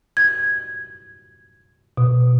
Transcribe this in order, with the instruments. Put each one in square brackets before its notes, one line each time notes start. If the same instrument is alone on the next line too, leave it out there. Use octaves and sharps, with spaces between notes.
[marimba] G#6
B2